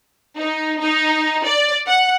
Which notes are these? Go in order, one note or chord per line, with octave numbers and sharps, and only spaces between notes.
D#4
D#4
D5
F#5